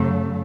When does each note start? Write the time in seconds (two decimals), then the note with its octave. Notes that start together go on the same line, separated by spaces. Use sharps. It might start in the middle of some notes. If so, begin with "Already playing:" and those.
Already playing: F#2 C#3 F#3 A3